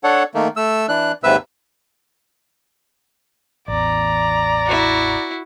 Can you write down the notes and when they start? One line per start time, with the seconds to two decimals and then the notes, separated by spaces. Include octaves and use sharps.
0.04 D4 A4 C#5 F#5
0.35 D#3 A3 A#3
0.56 A3 E6
0.89 E3 D4 F#6
1.24 D#2 G#2 C3 B4 E5 E6
3.68 A1 E2 D5 A#5
4.67 E4 F#4